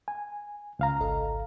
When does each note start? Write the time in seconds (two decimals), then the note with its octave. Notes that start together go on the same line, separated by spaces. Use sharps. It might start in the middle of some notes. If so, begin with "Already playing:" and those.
0.08 G#5
0.79 C#2 F5 A#5
1.01 G#1 A4 D#5